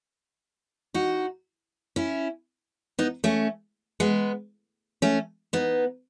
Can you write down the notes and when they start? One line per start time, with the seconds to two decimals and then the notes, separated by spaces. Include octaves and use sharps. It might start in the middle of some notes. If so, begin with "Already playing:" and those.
0.94 D#4 F#4
1.96 C#4 E4
2.99 B3 D#4
3.24 A3 C#4
4.00 G#3 B3
5.02 A3 C#4
5.53 B3 D#4